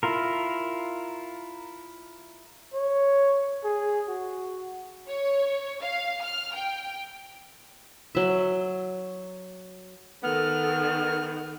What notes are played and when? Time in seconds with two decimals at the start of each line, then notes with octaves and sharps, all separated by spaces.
0.03 E4 F4 A#4
2.74 C#5
3.64 G#4
4.08 F#4
5.06 C#5
5.80 F5
6.22 F6
6.53 G5
8.15 F#3 E5
10.24 D#3 B3 A4 F6